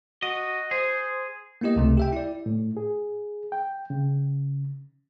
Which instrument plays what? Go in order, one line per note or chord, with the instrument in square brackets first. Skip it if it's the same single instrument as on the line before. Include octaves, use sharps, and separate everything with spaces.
[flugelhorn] F#4 [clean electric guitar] D#5
[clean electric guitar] G#4 [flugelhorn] C5
[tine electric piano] A#3 B3 E4 G4 D#5
C#2 C3 A3
G4 E5 G5
E4 D5
[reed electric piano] A2
G#4
G5
C#3